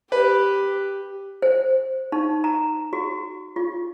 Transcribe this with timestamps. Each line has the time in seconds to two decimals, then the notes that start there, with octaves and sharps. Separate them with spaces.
0.12 G4 B4
1.42 C5
2.12 D#4
2.44 A#5
2.93 F#4
3.56 F4